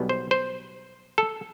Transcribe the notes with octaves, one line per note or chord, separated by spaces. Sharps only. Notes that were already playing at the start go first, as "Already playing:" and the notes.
Already playing: B1 B2 G3 B3
C5
C5
A4